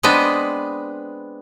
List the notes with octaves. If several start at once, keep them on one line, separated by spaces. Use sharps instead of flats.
G#3 B3 C4 D4 B4 D#5